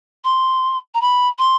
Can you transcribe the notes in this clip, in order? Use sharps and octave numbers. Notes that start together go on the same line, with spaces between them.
C6
A#5
B5
C6